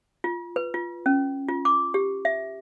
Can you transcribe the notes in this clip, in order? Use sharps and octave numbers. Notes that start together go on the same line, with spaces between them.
F4
B4
F4
C#4
F4
D6
G4
E5